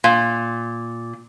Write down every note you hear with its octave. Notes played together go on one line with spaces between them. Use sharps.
A#2